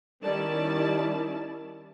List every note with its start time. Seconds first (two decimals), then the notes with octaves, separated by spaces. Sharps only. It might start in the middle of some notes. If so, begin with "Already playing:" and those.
0.22 D#3 G3 C#4 E4 D5 A5